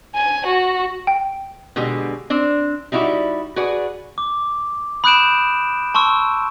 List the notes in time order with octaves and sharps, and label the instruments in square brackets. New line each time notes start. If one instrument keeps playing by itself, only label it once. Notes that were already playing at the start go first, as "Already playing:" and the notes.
[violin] G#5
F#4
[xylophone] G5
[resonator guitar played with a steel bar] B2 D3 G#3 G4
C4 D4
G3 D#4 E4 F#4 D5
F#4 G#4 B4 D5
[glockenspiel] D6
B5 D#6 F#6 G6 D7 E7
A5 C6 C#6 E6